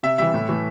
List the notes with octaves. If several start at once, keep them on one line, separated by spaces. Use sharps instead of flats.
C3 E5
E3 G3 E5
A2
E3 A3